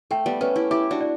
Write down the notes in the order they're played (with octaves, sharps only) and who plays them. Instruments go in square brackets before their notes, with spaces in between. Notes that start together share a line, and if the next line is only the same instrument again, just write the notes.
[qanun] A3 [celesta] G5
[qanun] G3 B3
[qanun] A3 C#4 [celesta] B4
[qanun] E4 G4
[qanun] E4 G4 [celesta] D6
[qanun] D4 F#4
[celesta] D5